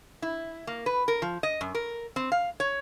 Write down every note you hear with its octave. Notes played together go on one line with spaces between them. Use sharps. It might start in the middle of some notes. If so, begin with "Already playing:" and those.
E4
A#3
B4
A#4
F3
D#5
F#2
A#4
C4
F5
C#5